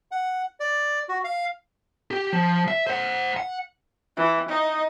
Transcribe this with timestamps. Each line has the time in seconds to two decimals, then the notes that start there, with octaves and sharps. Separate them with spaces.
0.11 F#5
0.60 D5
1.09 F#4
1.24 F5
2.11 G4
2.33 F3
2.68 E5
2.87 C5 F#5
3.37 F#5
4.17 E3
4.49 D#4